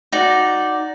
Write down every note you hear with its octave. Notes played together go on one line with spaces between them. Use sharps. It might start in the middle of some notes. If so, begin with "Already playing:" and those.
D#4 F#4 D5